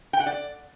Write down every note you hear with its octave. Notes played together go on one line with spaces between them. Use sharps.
G5
F#5
D5